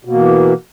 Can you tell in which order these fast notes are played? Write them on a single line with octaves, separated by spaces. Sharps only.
B2 A#3 E3